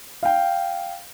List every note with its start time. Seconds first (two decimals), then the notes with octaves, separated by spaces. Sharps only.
0.23 F5 G5